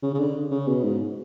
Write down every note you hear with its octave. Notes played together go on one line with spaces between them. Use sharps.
C#3
C#3
D3
C#3
B2
G#2